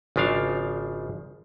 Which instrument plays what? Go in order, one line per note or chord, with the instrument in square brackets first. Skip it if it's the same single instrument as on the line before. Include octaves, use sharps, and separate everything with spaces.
[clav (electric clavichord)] G#1 C#3 F3 D4 F5